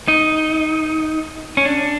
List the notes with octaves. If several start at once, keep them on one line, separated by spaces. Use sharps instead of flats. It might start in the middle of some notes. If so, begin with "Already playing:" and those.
D#4
C#4
D4